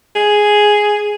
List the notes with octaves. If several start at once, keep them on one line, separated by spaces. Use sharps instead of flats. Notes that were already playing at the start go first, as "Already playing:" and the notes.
G#4